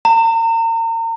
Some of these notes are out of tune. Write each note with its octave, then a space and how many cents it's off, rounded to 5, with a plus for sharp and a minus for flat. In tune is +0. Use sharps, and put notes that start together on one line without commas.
A#5 -35